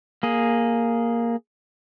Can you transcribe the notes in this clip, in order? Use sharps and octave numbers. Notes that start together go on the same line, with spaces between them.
A#3 G#4